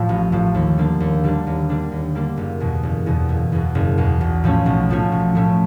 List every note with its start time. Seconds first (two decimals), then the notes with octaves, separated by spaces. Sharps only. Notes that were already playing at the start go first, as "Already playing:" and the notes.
Already playing: A2 F3
0.09 A1
0.32 A2 F3
0.55 D#2
0.77 D3 G3 A#3 D4
1.00 D#2
1.23 D3 G3 A#3 D4
1.47 D#2
1.70 D3 G3 A#3 D4
1.92 D#2
2.15 D3 G3 A#3 D4
2.37 F#1
2.60 E2 B2
2.83 F#1
3.06 E2 B2
3.29 F#1
3.52 E2 B2
3.75 F#1
3.98 E2 B2
4.21 B1
4.44 A2 F3 A3 C#4
4.66 B1
4.89 A2 F3 A3 C#4
5.12 B1
5.35 A2 F3 A3 C#4